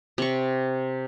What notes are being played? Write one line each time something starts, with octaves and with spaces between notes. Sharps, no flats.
C3 C#6